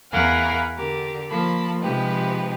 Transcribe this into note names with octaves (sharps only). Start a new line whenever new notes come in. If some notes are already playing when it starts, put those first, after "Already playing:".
E2 A#4 F5 F#5 G#5 B5
D3 G4 A#4
F3 A#3 A5 B5
C3 F3 G#3 D#4 G4 B4